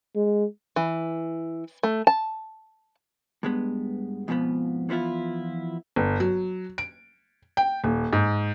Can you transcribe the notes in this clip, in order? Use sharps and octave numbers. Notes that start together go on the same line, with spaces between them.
G#3
E3
A3
A5
G2 G#3 B3
F2 G#2 B2 F3 B3
E3 F3 B3 E4 F4
G1
F#3
D7
G5
D#1
G#2